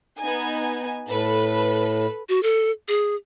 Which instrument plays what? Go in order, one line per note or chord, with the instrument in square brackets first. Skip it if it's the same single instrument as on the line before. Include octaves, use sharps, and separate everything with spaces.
[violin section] B3 D#4 G#5
[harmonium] A2 [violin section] A4 B4
[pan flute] F#4
A4
G#4